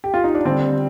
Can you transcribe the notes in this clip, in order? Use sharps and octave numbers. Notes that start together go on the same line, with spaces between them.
G4
F4
D#4
D4
D3 G3 C4